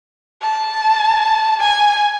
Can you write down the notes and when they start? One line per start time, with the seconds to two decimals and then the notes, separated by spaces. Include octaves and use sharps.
0.42 A5
1.60 G#5